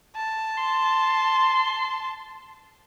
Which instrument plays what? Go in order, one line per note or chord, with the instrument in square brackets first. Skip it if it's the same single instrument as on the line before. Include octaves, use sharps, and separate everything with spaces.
[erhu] A5
[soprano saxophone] C6